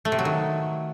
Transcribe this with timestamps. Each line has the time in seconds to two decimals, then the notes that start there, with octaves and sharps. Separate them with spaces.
0.05 A3
0.12 C3
0.19 F#3
0.25 D#3